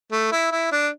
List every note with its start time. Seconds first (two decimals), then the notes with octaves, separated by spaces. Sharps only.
0.12 A3
0.32 E4
0.52 E4
0.72 D4